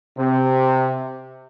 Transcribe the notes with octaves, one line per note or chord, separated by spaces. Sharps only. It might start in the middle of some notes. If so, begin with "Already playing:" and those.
C3